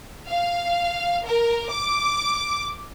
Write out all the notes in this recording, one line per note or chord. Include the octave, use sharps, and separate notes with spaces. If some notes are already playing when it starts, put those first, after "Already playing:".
F5
A#4
D6